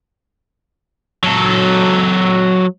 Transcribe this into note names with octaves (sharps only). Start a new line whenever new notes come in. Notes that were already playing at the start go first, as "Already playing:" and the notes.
F#3 A4